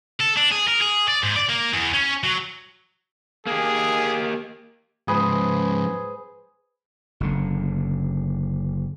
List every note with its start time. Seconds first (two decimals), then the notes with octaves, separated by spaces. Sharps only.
0.20 A4
0.37 D4
0.51 G#4
0.68 A#4
0.82 G#4
1.08 D5
1.23 G#2
1.36 D5
1.49 A#3
1.73 E2
1.94 C#4
2.24 F#3
3.47 A#3 G4 G#4
5.08 G#2 F3 G#4 B4 C5
7.20 F#1 D3